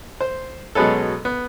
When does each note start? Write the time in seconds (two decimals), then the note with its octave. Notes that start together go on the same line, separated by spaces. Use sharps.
0.21 C5
0.75 B2 F#3 G#3 B3 C#4 A4
1.25 B3